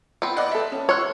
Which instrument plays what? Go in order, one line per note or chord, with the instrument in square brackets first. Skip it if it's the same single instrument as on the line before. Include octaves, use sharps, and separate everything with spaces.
[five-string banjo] B3 C4
[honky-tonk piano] D5 D#5 F#5
A4 E5
C#4
[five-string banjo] C#5 [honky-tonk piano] C6 E6 F#6